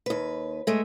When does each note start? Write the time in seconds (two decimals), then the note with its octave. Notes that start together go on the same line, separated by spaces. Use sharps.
0.06 D#2 B4
0.67 G#3 A3